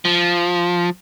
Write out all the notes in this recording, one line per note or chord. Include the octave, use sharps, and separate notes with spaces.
F3